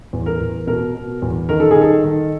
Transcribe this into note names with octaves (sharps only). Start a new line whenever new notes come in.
E2
A#4
E2
B2 A#4
B2
E2
D#3 A#4
A4
G#4
D#3
A4
D#3